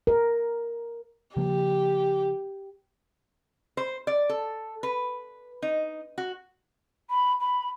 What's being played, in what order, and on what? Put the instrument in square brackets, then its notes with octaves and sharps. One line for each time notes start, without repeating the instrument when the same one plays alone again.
[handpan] A#4
[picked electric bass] C#3 F3 A#3 [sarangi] G4
[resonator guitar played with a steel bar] C5
D5
A4
B4
D#4
F#4
[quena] B5
B5